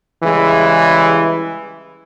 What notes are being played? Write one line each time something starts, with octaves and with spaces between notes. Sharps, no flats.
C#3 E3 G3 G#3 E4